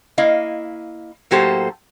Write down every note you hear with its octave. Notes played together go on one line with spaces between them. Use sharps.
A#3 E4 D#5 F5
A2 F#3 A#3 G4 A4 C5